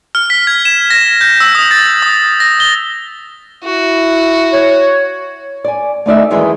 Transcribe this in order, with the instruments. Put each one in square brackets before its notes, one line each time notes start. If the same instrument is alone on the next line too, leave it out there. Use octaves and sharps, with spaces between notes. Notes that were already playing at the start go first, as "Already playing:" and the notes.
[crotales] F6
B6
G#6
E7
A#6
G6
E6
D#6
A6
D#6
A#6
G7
[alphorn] E4 [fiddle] F#4
[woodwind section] C#5
[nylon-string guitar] D5 G#5
A3 D#4 D5 E5
F#2 D#3 E3 G#3 G#4